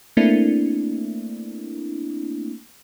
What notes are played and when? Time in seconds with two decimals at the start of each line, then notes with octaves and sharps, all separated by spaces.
0.17 A3 A#3 C4 D4 E4